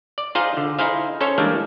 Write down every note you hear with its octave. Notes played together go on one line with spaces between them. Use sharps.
D5
D#4 F4 G#4 C5 D#5 F5
D3
D#4 E4 G#4 C5 F5
C#4 A4 C5 C#5
E3 G3 G#3 A#3 D4